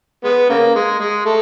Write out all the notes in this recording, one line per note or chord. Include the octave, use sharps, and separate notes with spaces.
G#3 B3
C#3 A#3
G#3
G#3
A3